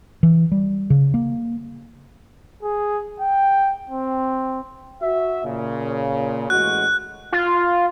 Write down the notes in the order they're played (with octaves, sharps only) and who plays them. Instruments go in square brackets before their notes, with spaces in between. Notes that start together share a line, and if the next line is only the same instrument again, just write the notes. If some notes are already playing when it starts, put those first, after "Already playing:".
[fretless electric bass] E3
G3
C#3
A#3
[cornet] G#4
G5
C4
[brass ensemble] F#4 E5
A#2 C#3
[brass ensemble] A1 G#3 F#4 [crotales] F#6
[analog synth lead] F4